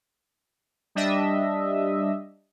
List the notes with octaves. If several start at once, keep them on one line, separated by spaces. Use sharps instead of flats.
G3 D4 D#5 E5